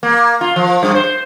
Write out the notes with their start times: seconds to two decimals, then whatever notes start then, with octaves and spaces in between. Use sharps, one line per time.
0.03 A#3
0.41 F4
0.56 F3
0.83 G2
0.95 C5